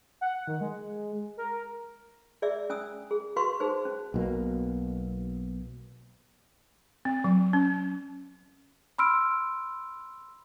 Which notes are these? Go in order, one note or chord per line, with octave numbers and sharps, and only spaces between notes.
F#5
D#3
G#3
A#4
G#4 D5 E5 E6
C#4 G#5 D#6 E6
G#4
F#4 B4 F5 C6 C#6
D#4 G#4 B4 C5
C#4
B1 B2 A#3
C4
F#3
C#4
B5 C6 E6 F6 D7